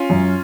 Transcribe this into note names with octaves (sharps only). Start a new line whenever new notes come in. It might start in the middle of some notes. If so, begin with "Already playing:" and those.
Already playing: C#4 F4
F#2